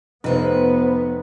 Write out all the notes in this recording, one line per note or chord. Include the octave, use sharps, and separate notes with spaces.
F1 F2 F3 B3 B4